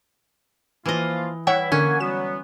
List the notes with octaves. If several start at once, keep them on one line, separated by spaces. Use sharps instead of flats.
E3 F3 A#3 F4 D#5
E3 G3 E4 C#5 E5 F#5 G5
D3 A#3 C#4 F#5 G#5
F#3 G3 B3 E7